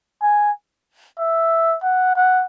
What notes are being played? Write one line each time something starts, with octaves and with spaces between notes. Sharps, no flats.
G#5
E5
F#5
F#5